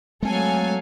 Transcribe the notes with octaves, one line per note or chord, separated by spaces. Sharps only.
F#3 G#3 A3 C4 A4 F5 G#5